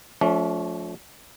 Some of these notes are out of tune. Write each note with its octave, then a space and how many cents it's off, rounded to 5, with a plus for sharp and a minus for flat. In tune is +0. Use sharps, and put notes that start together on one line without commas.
F3 +25 A3 -15 C#4 +45